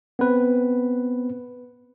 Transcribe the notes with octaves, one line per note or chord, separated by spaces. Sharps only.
B3 C4 B4